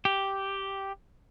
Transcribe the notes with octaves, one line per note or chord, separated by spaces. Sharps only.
G4